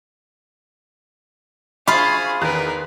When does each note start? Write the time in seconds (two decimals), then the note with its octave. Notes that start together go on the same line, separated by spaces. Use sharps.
1.88 F4 G#4 C5 F5 B5 C#6
2.42 E2 D#3 A#4 B4 F#6